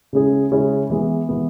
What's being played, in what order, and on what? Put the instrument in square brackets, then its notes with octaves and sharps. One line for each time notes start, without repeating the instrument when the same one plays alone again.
[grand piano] C#3 G#3 C#4 E4 G#4
C#3 G#3 C#4 E4 G#4
E3 G#3 B3
E3 G#3 B3